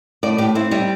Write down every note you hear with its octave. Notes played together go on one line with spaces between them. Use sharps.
A2 D5
A2 G4
C4 E4
G3 E4